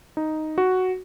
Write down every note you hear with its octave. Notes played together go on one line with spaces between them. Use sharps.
D#4
F#4